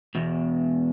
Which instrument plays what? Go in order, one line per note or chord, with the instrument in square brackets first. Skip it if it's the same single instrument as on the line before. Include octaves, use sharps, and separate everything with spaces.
[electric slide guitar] E2 B2